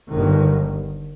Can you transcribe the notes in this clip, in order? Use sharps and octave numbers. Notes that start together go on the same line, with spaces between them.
G1 G2 D#3